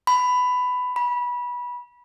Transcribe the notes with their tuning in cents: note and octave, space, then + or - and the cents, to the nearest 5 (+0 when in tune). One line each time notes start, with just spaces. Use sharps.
B5 +15
B5 -20